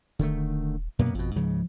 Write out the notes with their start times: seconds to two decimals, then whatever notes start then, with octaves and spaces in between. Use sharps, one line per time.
0.19 D#1 D3 D#3 A3
0.99 F#2 B2 A#3 B3
1.15 G#1 F2 B2
1.36 C#2 G#2 C#3 F3